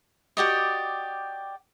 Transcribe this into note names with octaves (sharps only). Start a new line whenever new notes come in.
F#4 G4 D5 D#5